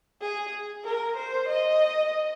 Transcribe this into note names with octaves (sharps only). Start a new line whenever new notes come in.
G#4
A#4
C5
D#5